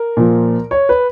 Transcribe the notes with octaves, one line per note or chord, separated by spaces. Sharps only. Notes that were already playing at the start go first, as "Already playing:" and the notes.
Already playing: A#4
A#2 F3
C#5
B4